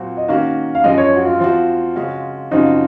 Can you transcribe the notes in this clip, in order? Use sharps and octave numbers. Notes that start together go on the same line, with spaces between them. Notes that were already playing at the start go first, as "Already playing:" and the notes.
Already playing: A#2 F#3 C4 F#4
D#5
D#3 A#3 C#4 F#4 F5
F5
F#2 F3 G#3 D#5
C#5
F#4
F4
F3 C4 F#4
C#3 G#3 C#4 F#4
F#2 C#3 F3 C4 D#4 F#4